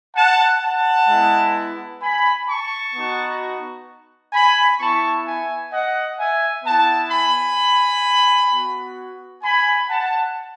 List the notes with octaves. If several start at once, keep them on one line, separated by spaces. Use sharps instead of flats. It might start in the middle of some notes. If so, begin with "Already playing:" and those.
F#5 A5
F#5 A5
G#3 B3 E4
G#5 B5
A5 C#6
B3 D#4 F#4
G#5 B5
B3 E4 A5 C#6
E5 G#5
D#5 F#5
E5 G#5
B3 E4 F#5 A5
G#5 B5
B3 F#4
G#5 B5
F#5 A5